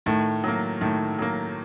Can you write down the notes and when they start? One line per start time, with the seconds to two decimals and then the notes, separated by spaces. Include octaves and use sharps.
0.06 A2 D#3
0.44 F#3 A#3
0.81 A2 D#3
1.19 F#3 A#3